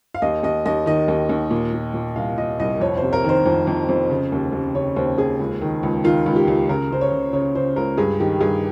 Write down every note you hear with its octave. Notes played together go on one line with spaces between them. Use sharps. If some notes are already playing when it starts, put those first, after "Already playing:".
F5
D#2 D#5
D#2 D#5
D#2 D#5
D#3 D#5
D#2
D#2
A#2
A#2
A#2
C2 F5
A#2 D#5
C2 D#5
F2 C#5
C3 C5
A#4
D#3 C5
F2
F2
F2
C#3
D#2
D#2
C#3 C#5
D#2 C5
D#2 G#4
C#2
D#3
C#2
D#3 F4
C#2
G4
C#2
C#3 A#4
C#3 C5
C#5
C#3
C#3 C#5
C#3 C5
C#2 A#4
G2 G#4
D#3 G4
G2 G#4